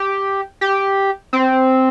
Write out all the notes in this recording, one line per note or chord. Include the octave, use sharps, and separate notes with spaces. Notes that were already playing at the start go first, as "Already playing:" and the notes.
Already playing: G4
G4
C4